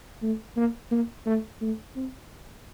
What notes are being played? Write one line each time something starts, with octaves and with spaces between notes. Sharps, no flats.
A3
A#3
A#3
A3
A3
C4